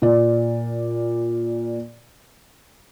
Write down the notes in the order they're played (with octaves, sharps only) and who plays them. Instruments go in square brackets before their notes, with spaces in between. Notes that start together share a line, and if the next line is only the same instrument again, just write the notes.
[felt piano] A#2 D5